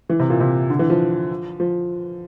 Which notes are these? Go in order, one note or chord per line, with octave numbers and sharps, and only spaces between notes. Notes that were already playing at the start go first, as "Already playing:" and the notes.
E3
C3
A#2
C3
D3
E3
F3
F3